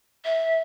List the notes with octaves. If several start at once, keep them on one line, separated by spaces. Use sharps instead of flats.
E5